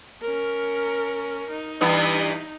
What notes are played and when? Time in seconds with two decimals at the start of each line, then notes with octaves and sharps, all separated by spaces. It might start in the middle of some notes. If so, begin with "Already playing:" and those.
0.21 C#4 A#4
1.50 D#4
1.81 G2 E3 B3